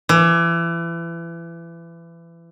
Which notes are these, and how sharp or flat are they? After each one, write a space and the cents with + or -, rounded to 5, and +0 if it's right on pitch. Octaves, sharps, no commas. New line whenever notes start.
E3 +30